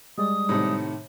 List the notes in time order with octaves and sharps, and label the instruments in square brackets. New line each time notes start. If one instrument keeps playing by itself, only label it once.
[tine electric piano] G3 G#3 D5 [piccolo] D#6
[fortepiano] A2 C3 D#3